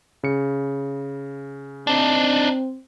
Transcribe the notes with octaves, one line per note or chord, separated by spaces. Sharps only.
C#3 C#7
C4 D4 D#4